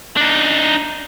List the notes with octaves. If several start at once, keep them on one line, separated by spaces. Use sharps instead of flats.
D4 D#4